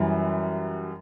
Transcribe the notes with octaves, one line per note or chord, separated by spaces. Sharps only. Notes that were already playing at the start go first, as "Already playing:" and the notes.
Already playing: F#2 E3 G3